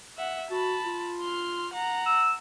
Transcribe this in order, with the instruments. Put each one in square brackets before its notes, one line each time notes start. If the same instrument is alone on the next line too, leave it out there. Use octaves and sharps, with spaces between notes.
[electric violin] E5 F#5
[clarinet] F#4 [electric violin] A5 B5
[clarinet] F4
[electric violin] C6 F6
F#5 A#5
[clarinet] E6